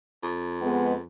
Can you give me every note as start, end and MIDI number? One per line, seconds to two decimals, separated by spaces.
0.23 1.06 41
0.61 0.92 56
0.61 0.92 59